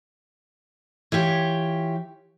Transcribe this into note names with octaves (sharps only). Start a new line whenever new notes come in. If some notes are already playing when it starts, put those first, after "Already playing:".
E3 F4 G4 C#5